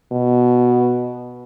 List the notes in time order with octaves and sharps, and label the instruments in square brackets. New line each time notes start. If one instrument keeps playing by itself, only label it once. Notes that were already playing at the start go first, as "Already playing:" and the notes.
[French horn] B2